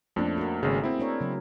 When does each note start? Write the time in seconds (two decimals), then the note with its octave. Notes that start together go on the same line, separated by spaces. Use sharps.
0.16 F2 A3 A#3 C#4 D4
0.37 F#4 A#4
0.63 G#1 C#3 G#4
0.84 C4 E4
1.00 D4 A#4 C#5
1.21 C#3 F#3